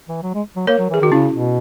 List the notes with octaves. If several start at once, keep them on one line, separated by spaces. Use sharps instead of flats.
E3
F#3
G#3
F#3
A#3 A#4 C#5
F#3
E3
G#4
D#3 F#4
C#3 C#4 E4
B2